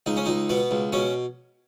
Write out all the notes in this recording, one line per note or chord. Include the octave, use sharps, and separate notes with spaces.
C#2 D#4
C#4
C#2 D#4
B2 B3
C#2
B2 C#4